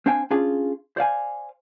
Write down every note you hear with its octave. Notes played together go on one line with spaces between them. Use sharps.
C4 D4 C5 F5 G5 G#5
C#4 D4 F4 G#4
C5 D5 F5 G#5